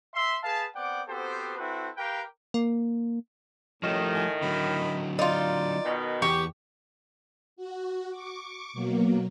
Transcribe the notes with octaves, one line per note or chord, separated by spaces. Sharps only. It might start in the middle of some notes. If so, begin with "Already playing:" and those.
E5 C6
G#4 B4 F5 A5
B3 C4 D5 F#5 G5 D6
B3 C4 F#4 G4 A4 C5
C4 E4 F#4 A4 B4
G4 A#4 B4 F5 G5
A#3
A2 D#3 F3 G3 A3 C#4
G#5
D3 F#3 B5
D#4 F4 D5
B2 D#3
E2 G4 C#6
F#4
C#6 D6
B2 F#3 A#3